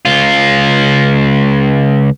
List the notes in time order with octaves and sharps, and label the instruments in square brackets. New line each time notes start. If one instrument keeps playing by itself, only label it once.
[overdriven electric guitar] C#2 F4